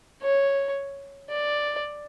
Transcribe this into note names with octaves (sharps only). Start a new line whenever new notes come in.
C#5
D5